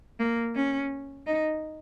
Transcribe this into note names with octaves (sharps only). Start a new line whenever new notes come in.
A#3
C#4
D#4